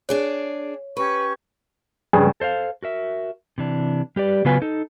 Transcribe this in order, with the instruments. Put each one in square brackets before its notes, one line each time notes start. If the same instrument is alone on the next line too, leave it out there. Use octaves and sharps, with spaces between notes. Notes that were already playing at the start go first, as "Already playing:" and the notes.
[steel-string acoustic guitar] D4 G#4 D5 [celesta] C#5
[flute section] C#4 G4 C#6 [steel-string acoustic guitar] B4
[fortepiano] G2 C#3 [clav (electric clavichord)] G#4 B4
[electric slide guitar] A4 C5 D#5 F5
F#4 A#4 E5
C3 E3 D4
G3 G4 B4 D5
C#3 F#3 B3 F4 B4 G#5
D#4 A4